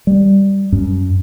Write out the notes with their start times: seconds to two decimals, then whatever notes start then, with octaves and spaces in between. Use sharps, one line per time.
0.07 G3
0.72 F#2